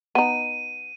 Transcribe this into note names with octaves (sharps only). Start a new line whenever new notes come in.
B3 D#4 D#7